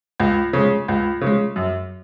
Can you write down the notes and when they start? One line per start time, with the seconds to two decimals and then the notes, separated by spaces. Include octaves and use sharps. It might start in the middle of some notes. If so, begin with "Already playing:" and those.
0.20 C#2
0.53 C#3 G#3
0.88 C#2
1.21 C#3 G#3
1.56 F#2